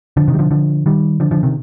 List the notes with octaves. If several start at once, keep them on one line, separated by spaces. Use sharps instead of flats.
D3 F3
C3 D#3
G3
D3 F3
D3 F3
D#3 G3
D3 F3
D3 F3
C3 D#3